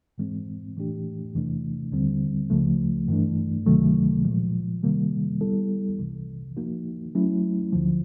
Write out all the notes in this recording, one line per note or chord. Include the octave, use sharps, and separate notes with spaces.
G#2 E3 G#3 C4
A2 E3 A3 D4 G4
E2 C3 E3 A3 D4
D#2 D3 G3 C4
C#2 C#3 F3 A3
G2 E3 A3 D4
C#2 C3 D#3 F#3 A3
A#2 F3 G#3
C3 D#3 G3 A#3
G3 B3 E4 A4
C2 C3 E3
F3 A#3 D#4 F#4
F#3 A3 C#4 E4
D2 D3 F3